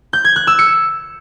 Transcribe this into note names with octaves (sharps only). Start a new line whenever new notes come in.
G6
G#6
F#6
E6
C#7